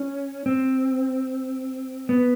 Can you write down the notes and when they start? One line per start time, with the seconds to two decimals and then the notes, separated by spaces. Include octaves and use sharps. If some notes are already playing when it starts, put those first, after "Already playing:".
Already playing: C#4
0.46 C4
2.09 B3